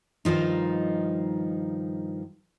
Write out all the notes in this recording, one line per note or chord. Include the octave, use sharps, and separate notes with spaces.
G2 D#3 F3 D#4